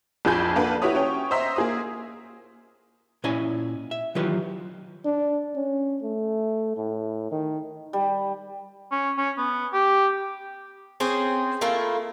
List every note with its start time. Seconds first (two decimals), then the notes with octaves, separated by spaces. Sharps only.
0.25 A#1 F2 G#4 A5 B5 G6
0.55 A#3 D4 F4 F#4 A4 B4
0.82 E4 F#4 G4 B4 C#5 D#6
0.95 C#4 C#5 G5
1.31 C5 D#5 E5 A#5 C6
1.56 A#3 G#4 D#6
3.24 A#2 C#4 E4 D#5 G#5
3.91 E5
4.15 D#3 E3 F#3 F4 G4 B4
5.05 D4
5.56 C#4
6.03 A3
6.77 A2
7.31 D#3
7.93 G3
8.92 C#4
9.18 C#4
9.38 B3
9.73 G4
11.00 C4 C#4 G#4 C5
11.61 A3 A#3 E4 F4